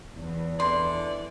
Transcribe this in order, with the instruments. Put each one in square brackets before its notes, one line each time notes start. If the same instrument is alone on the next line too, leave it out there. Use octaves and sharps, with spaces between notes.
[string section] E2
[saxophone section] D3 E3 D5 [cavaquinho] C6